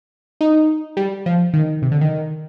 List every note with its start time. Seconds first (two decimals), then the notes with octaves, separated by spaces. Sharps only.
0.41 D#4
0.97 G3
1.26 F3
1.53 D#3
1.82 C3
1.92 D3
2.01 D#3